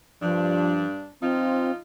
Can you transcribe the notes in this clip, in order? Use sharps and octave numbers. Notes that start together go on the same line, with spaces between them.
G2 F3 D4
F3 C4 D#4 F4